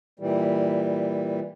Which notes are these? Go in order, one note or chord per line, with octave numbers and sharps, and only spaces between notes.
A#2 E3 G3